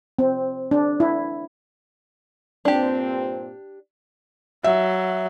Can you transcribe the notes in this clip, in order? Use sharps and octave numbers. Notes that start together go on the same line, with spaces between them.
C4
D4
E4
G2 A#2 C4 D4 G4
F#3 E5